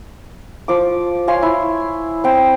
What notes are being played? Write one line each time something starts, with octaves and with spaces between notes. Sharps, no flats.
F3 D6
C#5 F5 G#5 C6
E4
C4 G5